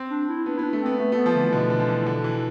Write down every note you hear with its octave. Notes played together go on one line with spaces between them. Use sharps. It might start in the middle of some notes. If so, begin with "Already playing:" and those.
Already playing: C4
D4
E4
B3 D4
B3 E4
D4
A3
B3 C4
A3 B3
A3
B3
F3
D3 E3
B2 D3
D3
F3
E3
D3
E3